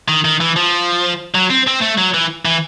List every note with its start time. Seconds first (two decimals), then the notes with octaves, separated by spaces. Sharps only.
0.08 D#3
0.25 D#3
0.41 E3
0.56 F3
1.35 F#3
1.50 C4
1.67 C4
1.81 A3
1.98 F#3
2.14 E3
2.45 E3